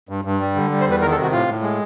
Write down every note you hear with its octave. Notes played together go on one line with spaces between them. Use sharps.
G2
G2
G3
D3
G3
C5
E2
B4
D#3 A#4
A4
C3 F#4
A2 F4
A2
G#3